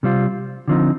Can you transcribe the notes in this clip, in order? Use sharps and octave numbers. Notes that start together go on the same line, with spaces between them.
C3 G3 C4 F4
D3 F3 C4 D#4